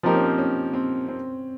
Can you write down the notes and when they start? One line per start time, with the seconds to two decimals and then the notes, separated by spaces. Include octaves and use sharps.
0.03 F3 A#3 C4 D#4 G4 A#4
0.15 C#4
0.26 C4
0.38 C#4
0.73 C4
1.08 C4